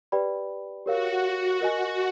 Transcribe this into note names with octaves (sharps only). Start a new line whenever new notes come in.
G4 B4 D5 G5 B5
F#4 G4 A#4 C#5 F5
A#4 D#5 G#5